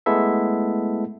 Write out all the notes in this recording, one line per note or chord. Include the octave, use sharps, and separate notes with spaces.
G#3 A3 B3 E4 A4 E5